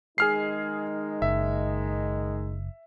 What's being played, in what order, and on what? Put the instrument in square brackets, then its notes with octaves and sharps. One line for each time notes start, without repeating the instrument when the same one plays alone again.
[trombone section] D#3 G#3 D#4 [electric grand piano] G#4 F6 C7
[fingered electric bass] F#1 [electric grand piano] E5